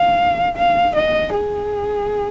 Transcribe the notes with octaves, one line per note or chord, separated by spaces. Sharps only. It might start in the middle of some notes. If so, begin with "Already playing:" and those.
Already playing: F5
F5
D#5
G#4